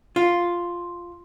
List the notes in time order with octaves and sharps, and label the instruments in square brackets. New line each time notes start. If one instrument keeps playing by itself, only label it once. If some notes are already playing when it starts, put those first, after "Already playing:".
[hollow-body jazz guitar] F4